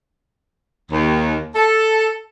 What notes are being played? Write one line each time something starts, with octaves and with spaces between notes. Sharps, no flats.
D#2
A4